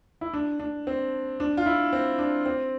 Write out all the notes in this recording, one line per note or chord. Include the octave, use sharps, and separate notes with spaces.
E4
D4
D4
C4
D4
F4
E4
C4
D4
C4